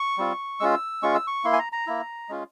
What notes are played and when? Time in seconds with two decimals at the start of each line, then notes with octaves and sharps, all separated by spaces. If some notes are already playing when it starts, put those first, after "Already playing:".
Already playing: C#6
0.18 G3 C4 F4
0.60 G#3 C#4 F4 E6
1.02 G#3 C#4 F4 C#6
1.14 E6
1.27 C#6
1.44 A#3 E4 C6
1.53 G#5
1.59 A#5
1.72 A#5
1.87 A#3 E4
2.29 G#3 C#4 F4